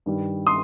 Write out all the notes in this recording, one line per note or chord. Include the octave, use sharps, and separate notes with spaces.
G2 D#3 G3
C6 D#6